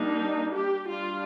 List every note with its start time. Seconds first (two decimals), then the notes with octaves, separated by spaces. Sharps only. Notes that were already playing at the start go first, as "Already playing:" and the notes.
Already playing: G3 A#3 D4 D#4
0.53 G4
0.88 G3 D4 F4